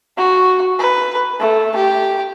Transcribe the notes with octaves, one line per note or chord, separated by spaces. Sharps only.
F#4
B4
A3
G4